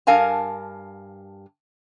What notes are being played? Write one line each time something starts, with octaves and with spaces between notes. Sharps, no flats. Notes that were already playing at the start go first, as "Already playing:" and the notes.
G2 A#4 F5 G#5 A5